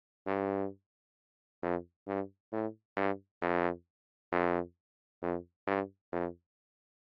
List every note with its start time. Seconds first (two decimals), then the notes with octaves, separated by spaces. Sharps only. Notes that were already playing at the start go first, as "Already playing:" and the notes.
0.27 G2
1.63 F2
2.07 G2
2.52 A2
2.97 G2
3.42 F2
4.33 F2
5.23 F2
5.67 G2
6.13 F2